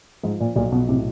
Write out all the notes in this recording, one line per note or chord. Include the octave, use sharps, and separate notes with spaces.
G#2 F3
A#2
B1 A#2
B2
A2 C3